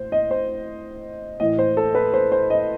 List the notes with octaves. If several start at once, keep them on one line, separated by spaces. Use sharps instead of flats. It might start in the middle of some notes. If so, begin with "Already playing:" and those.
Already playing: A2 C5
D#5
C5
A2 E3 D#5
C5
A4
B4
C5
C5
D#5